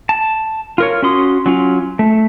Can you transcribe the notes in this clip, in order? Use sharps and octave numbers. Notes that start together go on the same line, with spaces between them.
A5
F4 A#4 C#5
C#4 F#4 C6 D#6
F#3 C#4 F4
A3